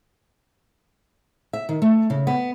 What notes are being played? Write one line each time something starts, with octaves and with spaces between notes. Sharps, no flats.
E5
D#3
A3
C#3
B3